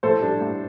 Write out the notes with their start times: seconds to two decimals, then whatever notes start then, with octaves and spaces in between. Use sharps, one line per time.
0.03 A2 A4 C5
0.22 G3 D4
0.41 A2